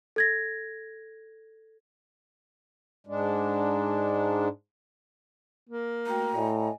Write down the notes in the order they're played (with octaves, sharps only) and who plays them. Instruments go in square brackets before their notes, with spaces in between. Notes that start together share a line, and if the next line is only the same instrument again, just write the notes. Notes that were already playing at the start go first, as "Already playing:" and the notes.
[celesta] A4 G#6 A#6
[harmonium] G#2 G#3 D4
[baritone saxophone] A#3
[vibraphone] A3 F#4 G5 [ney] A#5
[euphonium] A2 [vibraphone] D5 D#5 G#5